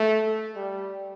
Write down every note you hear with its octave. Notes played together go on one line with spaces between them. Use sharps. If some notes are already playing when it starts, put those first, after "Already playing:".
Already playing: A3
G3